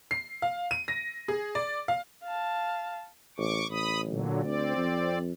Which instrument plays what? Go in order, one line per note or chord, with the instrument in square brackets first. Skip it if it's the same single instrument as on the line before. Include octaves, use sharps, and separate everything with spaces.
[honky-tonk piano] C7
F5
D#7
A#6
G#4
D5
F5
[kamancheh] F5 A5
[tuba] A1 [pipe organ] C#6 D6
[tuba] A1 [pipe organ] B5 D#6
[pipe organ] A#2 D3 F#3
[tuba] D2 [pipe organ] C4 D5
[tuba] F2